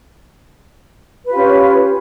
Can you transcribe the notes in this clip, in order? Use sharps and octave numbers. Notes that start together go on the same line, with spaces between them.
C#4 F4 G4 B4